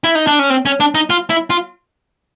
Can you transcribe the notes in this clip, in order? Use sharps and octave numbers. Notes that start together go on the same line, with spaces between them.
E4
D#4
D4
C#4
C4
C#4
D4
D#4
F4
E4
F4